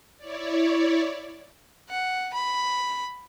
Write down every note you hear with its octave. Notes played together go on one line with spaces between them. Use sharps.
E4 C#5 D5
F#5
B5